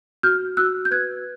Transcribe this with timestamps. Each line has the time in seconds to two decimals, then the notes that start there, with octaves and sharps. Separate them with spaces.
0.23 F#4 F6 G6
0.57 F#4 E6 F#6
0.85 G6
0.91 B4 F#6 G#6